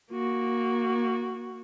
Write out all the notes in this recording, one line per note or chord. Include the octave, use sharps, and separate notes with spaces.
A#3 F#4